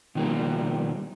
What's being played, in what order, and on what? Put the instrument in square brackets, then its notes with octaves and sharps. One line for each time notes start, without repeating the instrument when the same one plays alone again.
[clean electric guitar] B2 D#3 F3 G3 A#3